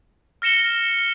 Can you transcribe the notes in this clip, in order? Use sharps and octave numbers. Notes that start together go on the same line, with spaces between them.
F6 A#6 C#7 E7 G7